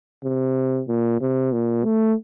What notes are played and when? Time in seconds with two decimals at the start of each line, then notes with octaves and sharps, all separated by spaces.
0.24 C3
0.88 A#2
1.21 C3
1.53 A#2
1.85 A3